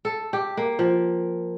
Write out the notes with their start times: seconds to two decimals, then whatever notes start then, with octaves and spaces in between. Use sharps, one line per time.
0.05 A4
0.33 G4
0.57 A#3
0.79 F3